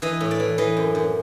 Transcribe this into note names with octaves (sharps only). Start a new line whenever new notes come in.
E3 D#5
A2
D5
E3
E3 D#5
F#2
F#2